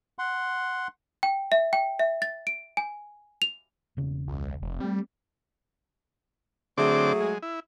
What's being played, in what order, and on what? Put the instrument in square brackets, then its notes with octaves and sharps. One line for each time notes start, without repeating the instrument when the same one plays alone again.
[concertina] F#5 C6
[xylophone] G5
E5
G5
E5
A6
D7
G#5
F7
[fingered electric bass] E1 C#3
[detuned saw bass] C#2
F1
[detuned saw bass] G3 [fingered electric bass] A3 C4
[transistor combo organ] D3 C4 D6 [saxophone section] F#3 A3 G#4
[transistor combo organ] G#3
E4